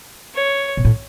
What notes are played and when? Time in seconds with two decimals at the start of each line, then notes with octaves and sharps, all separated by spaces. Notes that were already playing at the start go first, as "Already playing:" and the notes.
0.35 C#5
0.77 B2
0.85 A2